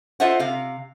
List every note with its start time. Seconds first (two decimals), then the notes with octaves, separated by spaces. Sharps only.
0.20 F4 A4 C5 D#5 E5 F#5
0.39 C3 F5